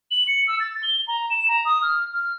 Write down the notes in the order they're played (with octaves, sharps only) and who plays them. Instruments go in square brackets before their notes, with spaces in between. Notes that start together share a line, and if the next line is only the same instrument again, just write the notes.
[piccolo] F#7
C#7
E6
A6
G7
A#5
E7
A#5
D#6
F6
F6